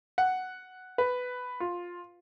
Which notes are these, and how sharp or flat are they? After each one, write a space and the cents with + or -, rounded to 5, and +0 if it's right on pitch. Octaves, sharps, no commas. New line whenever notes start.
F#5 +5
B4 +10
F4 +10